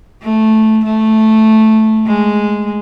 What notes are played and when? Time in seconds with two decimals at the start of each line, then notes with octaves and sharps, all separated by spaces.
0.23 A3
0.85 A3
2.06 G#3